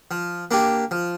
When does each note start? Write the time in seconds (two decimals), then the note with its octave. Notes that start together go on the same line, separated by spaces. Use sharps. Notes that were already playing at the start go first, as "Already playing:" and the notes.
0.11 F3
0.51 A#3 D4 G4
0.91 F3